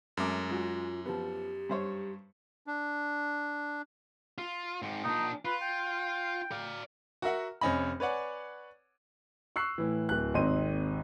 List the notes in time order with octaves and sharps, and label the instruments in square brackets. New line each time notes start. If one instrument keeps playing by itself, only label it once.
[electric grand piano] F#2 D6 [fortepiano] G#3 A3 A#4
[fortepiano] G#3 F#4 [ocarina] F4
[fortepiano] F3 B3 [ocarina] G4
[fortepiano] G2 C5 C#5
[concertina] D4
[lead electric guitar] F4
G#2 C4
[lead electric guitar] A#2 D4 [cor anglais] D#4
[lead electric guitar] F4 [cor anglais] B4
[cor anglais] G5
[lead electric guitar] D5 F5
[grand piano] F#4 A#4 E5 F#5
F1 C4 C#4 D#5 B5
B4 C#5 D5 F#5 G#5
C#6 E6 F#6 C7
A2 E3
D1 F#6
G#1 D#2 C4 D#5 C6 D#7